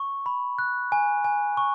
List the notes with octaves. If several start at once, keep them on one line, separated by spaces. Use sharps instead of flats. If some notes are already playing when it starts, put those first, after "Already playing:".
Already playing: C#6
B5
F#6
G#5
G#5
C#6